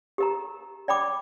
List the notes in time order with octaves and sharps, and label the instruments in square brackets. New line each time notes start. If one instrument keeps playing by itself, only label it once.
[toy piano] G4 A#4 A#5
D5 G5 B5 D6